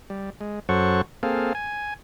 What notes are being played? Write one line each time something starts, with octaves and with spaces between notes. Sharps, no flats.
G3
G#3
F#2 F#3 A4 C5 F#5 C#6
A#3 C4 G#4 A4 F5
G#5